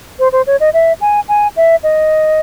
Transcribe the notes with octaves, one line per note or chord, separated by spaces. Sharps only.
C5
C5
C#5
D#5
E5
G#5
G#5
E5
D#5